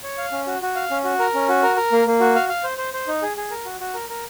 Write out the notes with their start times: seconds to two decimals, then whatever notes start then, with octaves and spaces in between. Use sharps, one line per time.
0.03 C#5
0.18 F5
0.32 C#4
0.47 F#4
0.62 F#4
0.76 F5
0.91 C#4
1.04 F#4
1.19 A#4
1.34 C#4
1.49 F#4
1.63 A#4
1.77 A#4
1.92 A#3
2.07 A#3
2.21 F#4
2.35 F5
2.49 F5
2.64 C5
2.78 C5
2.94 C5
3.07 D#4
3.22 G#4
3.37 G#4
3.51 A#4
3.65 F#4
3.80 F#4
3.94 A#4
4.09 A#4